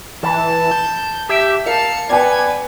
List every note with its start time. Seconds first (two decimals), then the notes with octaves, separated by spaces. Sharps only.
0.23 E3 A5
0.71 G6
1.29 G4 E5
1.66 A#4 F5 A5 C#7
2.10 B3 B4 D5 G5 G#5 G#6